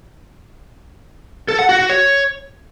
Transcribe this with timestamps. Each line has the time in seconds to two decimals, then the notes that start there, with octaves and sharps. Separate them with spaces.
1.48 A4
1.59 F#5
1.69 F#4
1.79 F#4
1.89 C#5